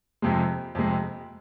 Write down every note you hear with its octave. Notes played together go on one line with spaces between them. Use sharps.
F2 C3 G#3
F2 C3 G#3